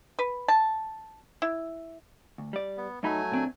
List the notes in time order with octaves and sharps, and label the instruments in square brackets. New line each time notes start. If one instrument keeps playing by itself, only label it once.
[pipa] B4
A5
E4
[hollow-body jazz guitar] D2
G3 D5
[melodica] B3
[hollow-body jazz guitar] F#2 D#4 B5 [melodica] F#3 A3 G#5
[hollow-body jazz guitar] A#2 C4 D4